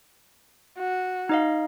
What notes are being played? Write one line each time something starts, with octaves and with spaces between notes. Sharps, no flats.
F#4
D#4 D#5 F5